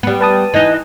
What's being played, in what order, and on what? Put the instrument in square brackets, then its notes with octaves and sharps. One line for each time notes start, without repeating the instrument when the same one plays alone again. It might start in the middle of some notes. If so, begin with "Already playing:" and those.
[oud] G3 B3
[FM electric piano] B4 A5 D#6
[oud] E3 D#4 [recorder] D#5